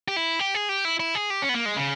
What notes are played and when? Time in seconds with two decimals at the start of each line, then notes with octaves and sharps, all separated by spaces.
0.08 G4
0.16 E4
0.39 G4
0.55 G#4
0.69 G4
0.85 E4
1.00 E4
1.15 G#4
1.30 G4
1.42 C#4
1.49 B3
1.54 A#3
1.66 G#3
1.77 C#3